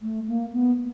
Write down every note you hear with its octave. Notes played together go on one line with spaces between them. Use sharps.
A3
A#3
B3